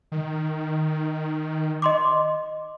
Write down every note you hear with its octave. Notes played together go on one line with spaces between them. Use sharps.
D#3
D#5 C6 D6